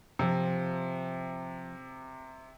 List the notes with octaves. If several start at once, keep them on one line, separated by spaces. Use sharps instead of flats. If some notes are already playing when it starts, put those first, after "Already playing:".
C3 F3 F5